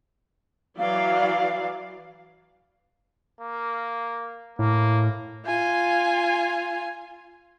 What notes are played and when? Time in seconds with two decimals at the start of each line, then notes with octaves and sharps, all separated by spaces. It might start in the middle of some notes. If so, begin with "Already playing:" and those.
0.78 E3 F#3 D5 F5
3.41 A#3
4.59 A2 A#3
5.46 F4 G#5